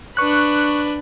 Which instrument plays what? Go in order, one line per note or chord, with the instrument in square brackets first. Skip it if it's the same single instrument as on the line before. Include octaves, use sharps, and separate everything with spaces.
[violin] D4 B4 [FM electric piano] C#6 F#6